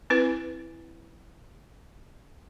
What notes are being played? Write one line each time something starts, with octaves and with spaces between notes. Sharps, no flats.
C4 E4 B4